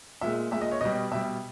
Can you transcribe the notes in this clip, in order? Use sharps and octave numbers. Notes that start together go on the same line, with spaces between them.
A#2 G#3 E5
A#2 G#3 E5
D#5
C#5
B2 G3 D#5
B2 G3 E5